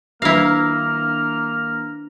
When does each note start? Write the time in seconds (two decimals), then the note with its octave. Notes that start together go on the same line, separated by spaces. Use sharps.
0.22 D#3 A#3 D4 E4 F5 F6 A#6